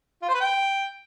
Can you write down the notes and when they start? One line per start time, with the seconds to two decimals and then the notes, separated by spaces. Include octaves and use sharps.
0.22 F4
0.28 C5
0.34 B4
0.40 G5